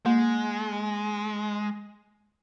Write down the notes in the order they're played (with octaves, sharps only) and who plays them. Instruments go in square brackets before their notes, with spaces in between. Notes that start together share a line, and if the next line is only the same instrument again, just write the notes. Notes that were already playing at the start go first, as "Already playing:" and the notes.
[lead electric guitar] G#3 [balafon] A#3